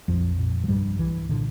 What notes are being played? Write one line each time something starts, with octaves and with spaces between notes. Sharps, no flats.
A#1 F2 F3
A#2
F3
C2 G2 G3
C2 E3
A#2 D3